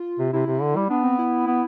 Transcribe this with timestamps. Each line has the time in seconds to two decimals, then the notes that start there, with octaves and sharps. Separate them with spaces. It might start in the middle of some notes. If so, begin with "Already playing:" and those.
Already playing: F4
0.19 C3
0.33 C3 E4
0.47 C3
0.61 D3
0.76 G3
0.90 B3 D4
1.04 C4
1.19 E4
1.47 B3